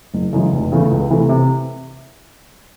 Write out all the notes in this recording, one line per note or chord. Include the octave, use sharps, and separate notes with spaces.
F#1
F#2 C#3 E3 G#3
F1
E2 C#3 E3 A3
C#2
C3 E3 A3
C3